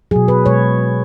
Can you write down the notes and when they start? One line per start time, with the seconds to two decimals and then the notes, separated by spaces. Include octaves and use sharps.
0.11 B2 F#3 G#4
0.28 B4
0.46 B2 G#3 C#5